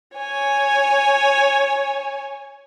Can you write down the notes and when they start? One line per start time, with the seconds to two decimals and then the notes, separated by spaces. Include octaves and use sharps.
0.17 C#5 G#5